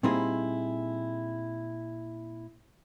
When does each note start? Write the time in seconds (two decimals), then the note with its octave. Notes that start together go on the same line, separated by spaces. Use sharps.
0.03 A#2 G3 C4 D#4 E4 G#4